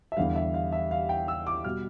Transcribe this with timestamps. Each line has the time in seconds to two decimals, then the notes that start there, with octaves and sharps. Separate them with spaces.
0.12 E5
0.17 E2 D3 G3 F5
0.36 E5
0.54 F5
0.72 E5
0.91 F5
1.09 G5
1.28 E6
1.47 D6
1.64 B2 G3 F6